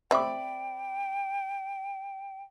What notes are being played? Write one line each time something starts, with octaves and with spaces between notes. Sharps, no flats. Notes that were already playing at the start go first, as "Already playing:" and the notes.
C4 D5 E5 G5 B5 D6